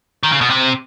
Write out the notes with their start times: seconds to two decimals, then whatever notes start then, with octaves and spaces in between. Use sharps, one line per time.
0.23 D#3
0.32 C#3
0.41 B2
0.50 C3